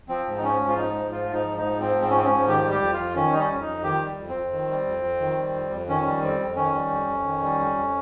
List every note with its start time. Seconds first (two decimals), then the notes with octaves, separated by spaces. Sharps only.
0.09 F3 C4
0.26 G#2
0.37 D#4
0.43 F3 C#4
0.61 G#2
0.68 F4
0.77 F3 D#4
0.94 G#2
1.11 F3 F4
1.29 G#2 D#4
1.46 F3
1.57 D#4
1.63 G#2
1.79 F3 C4
1.96 G#2
2.02 C4
2.10 C#4
2.14 F3 C4
2.24 C#4
2.30 G#2
2.47 D#3 G4
2.65 G3
2.71 G4
2.82 F2
2.93 F4
2.98 F2
3.15 D#3 C#4
3.32 G3 D#4
3.39 C#4
3.50 F2
3.62 D#4
3.67 F2
3.83 D#3 G4
4.01 G3
4.19 F2
4.29 C4
4.35 F2
4.53 D#3
4.69 G3
4.86 F2
5.04 F2
5.21 D#3
5.37 G3
5.54 F2
5.72 F2
5.89 D#3 C#4
6.05 G3
6.22 F2 C4
6.39 F2
6.56 D#3 C#4
6.73 G3
6.91 F2
7.07 F2
7.25 D#3
7.42 G3
7.59 F2
7.76 F2